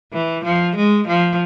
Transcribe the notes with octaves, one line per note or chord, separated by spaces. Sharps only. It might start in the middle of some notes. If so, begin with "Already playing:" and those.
E3
F3
G#3
F3